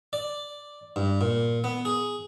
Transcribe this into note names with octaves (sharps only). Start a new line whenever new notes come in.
D5
G2
A#2
B3
G#4